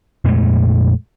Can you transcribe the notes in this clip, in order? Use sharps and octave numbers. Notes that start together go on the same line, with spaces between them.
F2 A#2 G#3 A3